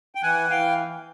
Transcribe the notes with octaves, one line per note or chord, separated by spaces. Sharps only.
G5
E3 F#5 G#5
E3 F5 G5